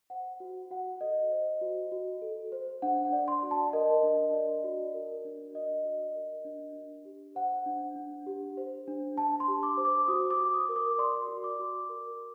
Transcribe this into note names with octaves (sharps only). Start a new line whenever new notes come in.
C5 F#5
F#4
F#4 F#5
A4 D#5
C5
F#4
F#4
A4
C5
D4 F#5
F#5
D5
C6
F#4
A5
A#4 D#5
D4
D5
F#4
A#4
D4
D5 D#5
F#4
A#4
D4
D4
G4
C5 F#5
D4
D4
G4
C5
D4
D4 A5
C6
G4
D6
C5
D6
F#4 D#6
D6
F#4
D#6
A#4
D6
D5 C6
F#4
D6
F#4
A#4